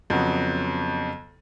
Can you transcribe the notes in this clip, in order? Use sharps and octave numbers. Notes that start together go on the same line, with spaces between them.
F2 C#3 F#3 B3